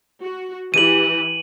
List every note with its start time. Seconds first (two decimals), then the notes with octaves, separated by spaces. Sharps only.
0.21 F#4
0.74 E3 G4 D#7 F#7